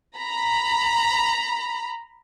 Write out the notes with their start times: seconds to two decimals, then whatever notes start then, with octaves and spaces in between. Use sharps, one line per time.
0.17 A#5 B5